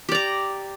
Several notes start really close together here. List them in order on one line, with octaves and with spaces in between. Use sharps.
G4 D5 A#5